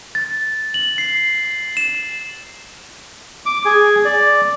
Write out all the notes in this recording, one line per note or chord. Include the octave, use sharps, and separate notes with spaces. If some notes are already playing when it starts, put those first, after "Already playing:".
A6
F#7
C7
E7
D6
G#4
D5